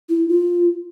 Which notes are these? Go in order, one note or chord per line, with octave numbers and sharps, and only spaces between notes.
E4
F4